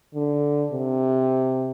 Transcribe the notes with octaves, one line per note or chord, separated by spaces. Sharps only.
D3
C3